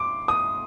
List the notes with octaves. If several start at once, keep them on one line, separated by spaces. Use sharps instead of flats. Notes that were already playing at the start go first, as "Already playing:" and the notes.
Already playing: C6 D6
D#6